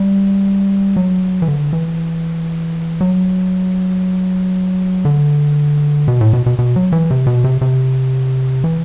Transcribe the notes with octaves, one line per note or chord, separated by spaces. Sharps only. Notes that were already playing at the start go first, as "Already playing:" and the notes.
Already playing: G3
F#3
E3
D3
E3
F#3
D3
B2
A2
B2
B2
B2
F#3
E3
C3
B2
C3
C3
E3